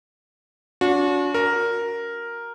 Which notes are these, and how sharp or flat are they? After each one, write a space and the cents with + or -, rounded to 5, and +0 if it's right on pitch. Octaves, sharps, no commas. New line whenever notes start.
D4 -40 F#4 -35
F#4 +0 A#4 +0